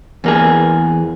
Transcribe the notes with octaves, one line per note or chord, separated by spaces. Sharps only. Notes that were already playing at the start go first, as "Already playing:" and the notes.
E2 A#3 G#4